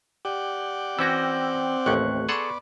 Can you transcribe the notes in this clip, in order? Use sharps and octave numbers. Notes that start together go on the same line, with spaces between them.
G4 D5 F#5 G5
E3 C4 C#4 F#4 E6 G6 A#6
A1 D#2 A3 C#6 F#6
B3 G#4 A4 D5 F#5 C6 C#6